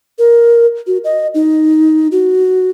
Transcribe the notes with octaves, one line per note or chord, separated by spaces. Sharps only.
A#4
F#4
D#5
D#4
F#4